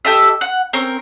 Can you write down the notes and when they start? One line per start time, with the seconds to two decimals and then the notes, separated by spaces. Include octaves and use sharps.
0.05 G4 A4 D#5 E5
0.41 F#5
0.73 C4 C#4 A#4